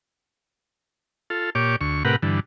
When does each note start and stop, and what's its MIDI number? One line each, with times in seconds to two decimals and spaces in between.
1.30 1.50 65
1.30 1.50 69
1.55 1.76 46
1.55 1.76 67
1.55 1.76 73
1.55 1.76 86
1.81 2.03 38
1.81 2.03 85
2.05 2.16 45
2.05 2.16 48
2.05 2.16 67
2.05 2.16 70
2.05 2.16 71
2.05 2.16 78
2.22 2.40 43
2.22 2.40 50
2.22 2.40 52